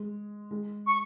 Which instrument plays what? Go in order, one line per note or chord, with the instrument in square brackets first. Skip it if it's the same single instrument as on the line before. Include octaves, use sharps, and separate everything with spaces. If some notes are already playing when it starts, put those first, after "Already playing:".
Already playing: [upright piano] G#3
G#3
[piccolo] C#6